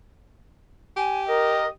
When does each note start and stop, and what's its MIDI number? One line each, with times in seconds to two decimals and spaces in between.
0.96 1.70 67
0.96 1.24 80
1.28 1.65 70
1.28 1.67 75